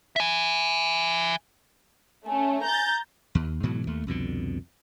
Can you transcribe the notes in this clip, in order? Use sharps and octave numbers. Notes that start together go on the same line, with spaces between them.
E5 G#5
A3 C#4 G#5
A#5 G6 A6
D#2
G#2 B2 E3 F#3
D#2 A3
C2 F2 B2 D3